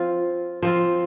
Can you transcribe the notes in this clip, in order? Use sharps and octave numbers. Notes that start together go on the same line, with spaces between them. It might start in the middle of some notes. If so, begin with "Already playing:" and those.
Already playing: F3 C4 F4
F3 C4 F4